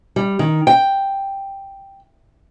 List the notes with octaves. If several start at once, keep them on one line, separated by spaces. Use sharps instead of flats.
G3
D#3
G5